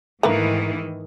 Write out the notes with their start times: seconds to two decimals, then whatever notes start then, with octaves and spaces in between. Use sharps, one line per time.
0.23 G#2 D#3 E3 A3 A#3 B4